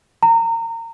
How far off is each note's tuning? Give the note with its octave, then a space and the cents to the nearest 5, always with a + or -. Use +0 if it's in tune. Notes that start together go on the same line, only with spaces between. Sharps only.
A#5 -25